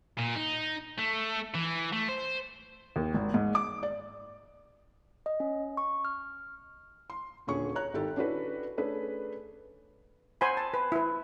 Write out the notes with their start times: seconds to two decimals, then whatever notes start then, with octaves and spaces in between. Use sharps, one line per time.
0.18 A#2
0.35 D#4
0.99 A3
1.55 E3
1.93 A3
2.09 C5
2.96 D#2
3.14 G#1
3.34 G#2
3.55 D6
3.83 D5
5.26 D#5
5.40 C#4
5.77 C#6
6.05 F6
7.10 C6
7.47 D#1 D3 C#4 G#4 C#6
7.75 C#5 A#5 F#6
7.93 G#1 D#3 G4 A4
8.16 C#4 D4 E4 F#4 A4 B4
8.77 A3 C#4 D4 G#4 B4
10.41 C5 F#5 G#5 B5
10.57 A5
10.74 B4
10.92 E4 B4